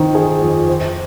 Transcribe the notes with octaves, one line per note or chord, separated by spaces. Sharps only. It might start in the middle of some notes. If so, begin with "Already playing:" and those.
Already playing: D#3 C4
G#4
F2
C5